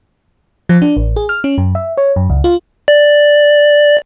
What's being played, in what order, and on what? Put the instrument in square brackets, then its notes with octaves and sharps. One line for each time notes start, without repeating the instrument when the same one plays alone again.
[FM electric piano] F3
D4
A1
G#4
F6
C#4
F#2
E5
C#5
F#2
C#2
F4
[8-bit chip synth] D5